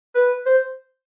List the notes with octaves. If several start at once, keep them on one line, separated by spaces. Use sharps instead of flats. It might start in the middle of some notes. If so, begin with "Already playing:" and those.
B4
C5